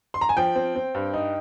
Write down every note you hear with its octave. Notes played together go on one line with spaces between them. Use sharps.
C6
A#5
G#5
F3 G5
C4
C4
G2
D#4